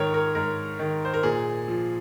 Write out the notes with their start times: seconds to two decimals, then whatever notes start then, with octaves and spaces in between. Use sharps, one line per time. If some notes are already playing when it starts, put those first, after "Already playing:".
Already playing: G#2 D#3 A#4 C#5
0.14 A#4
0.35 G#2 A#4
0.79 D#3
1.05 C5
1.14 A#4
1.23 A#2 G#4
1.68 F3